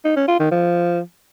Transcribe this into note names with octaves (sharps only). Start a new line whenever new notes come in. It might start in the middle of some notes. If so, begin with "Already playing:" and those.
D#4
C#4
F4
D#3
F3